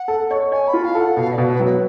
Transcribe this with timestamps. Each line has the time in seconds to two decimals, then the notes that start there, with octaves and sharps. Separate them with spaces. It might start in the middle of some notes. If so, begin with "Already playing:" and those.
Already playing: F#5
0.08 A4
0.31 C#5
0.52 C#5 G#5
0.67 B5
0.74 F4
0.84 F5
0.95 A4
1.00 F#5
1.16 B2 F5
1.33 D5
1.38 B2
1.49 B4
1.60 F#3
1.65 B4